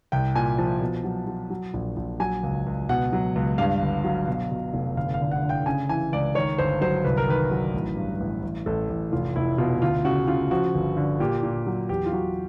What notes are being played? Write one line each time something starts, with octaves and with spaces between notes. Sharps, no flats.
C2 G5
A#2 G#5
F3 A5
B2
F#3
F#3
F#3
A#1
A#1
F#3 G#5
C#2
C#2
B2 F#5
F#3
C#2
G2 F5
G1
F#3
B2
B2
F1
G1 F5
F5
D3
F#5
D3
G5
C#3 G#5
E3 G#5
C#2 D5
D#3 C#5
G1 C5
F#3 C5
C2 B4
A#4
D#3 B4
F#3
A1
G2
A1
A1
A1 A4
A1
F1 F4
F1 E4
B2 F4
D2 F4
C#3 F#4
C#3 F4
F3 F#4
G1
D3
A#2 G4
A#2
F#3
E2 G4
F4
F#3 F#4